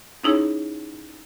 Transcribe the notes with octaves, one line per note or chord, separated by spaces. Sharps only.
C#4 D#4 E4 G#4 C#5